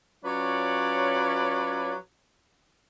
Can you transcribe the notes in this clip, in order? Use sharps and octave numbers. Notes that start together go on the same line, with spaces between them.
F#3 C#4 F4 B4 C#5 D5